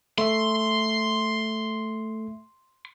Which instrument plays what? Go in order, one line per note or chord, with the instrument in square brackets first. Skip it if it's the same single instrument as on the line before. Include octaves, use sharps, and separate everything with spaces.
[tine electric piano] A3 E5 [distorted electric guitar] C6